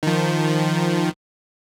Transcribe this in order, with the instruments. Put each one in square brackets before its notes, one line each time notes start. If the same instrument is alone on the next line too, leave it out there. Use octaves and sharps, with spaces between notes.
[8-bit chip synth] D#3 F3